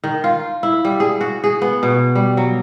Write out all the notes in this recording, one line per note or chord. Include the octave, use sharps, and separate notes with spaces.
D#3
F4
E4
G3
G#4
F#4
G#4
B3
B2
G3
F#3